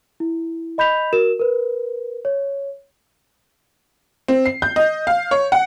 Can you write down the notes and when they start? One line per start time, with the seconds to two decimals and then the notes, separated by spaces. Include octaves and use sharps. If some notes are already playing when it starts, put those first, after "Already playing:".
0.20 E4
0.78 D#5 B5 G6 B6 F7
1.13 F#4 A#4 E7
1.40 A#4 B4
2.25 C#5
4.28 C4
4.46 C7
4.62 G6
4.76 D#5
5.07 F5
5.31 C#5
5.52 F#5